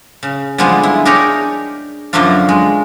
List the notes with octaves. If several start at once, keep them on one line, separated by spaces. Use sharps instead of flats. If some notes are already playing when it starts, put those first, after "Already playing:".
C#3
D3 F3 G3 G#3 B3
E4
D4 D#4 G4 G#4 A#4 C#5
F#2 D3 F3 A3 D4 F4
G#3